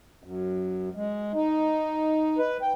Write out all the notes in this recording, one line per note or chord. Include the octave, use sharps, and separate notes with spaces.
F#2
G#3
D#4
B4
G5